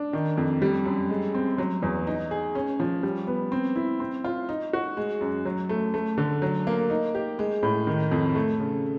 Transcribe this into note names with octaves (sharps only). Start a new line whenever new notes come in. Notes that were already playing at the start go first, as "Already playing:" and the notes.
Already playing: D4
D#3
F2
G3
F#2
G#3
C4
F#3
E2
D#4
G#4
C#4
F3
G3
B3
C4
E4
C4
F4
D#4
F#4
G#3
F#2
F#3
A3
A3
D3
F#3
A#3
D#4
G4
G#3
A2
D#3
F2
A3
C#3